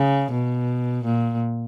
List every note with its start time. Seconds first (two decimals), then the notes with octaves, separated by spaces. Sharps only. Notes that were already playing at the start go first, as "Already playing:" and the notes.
Already playing: C#3
0.32 B2
1.05 A#2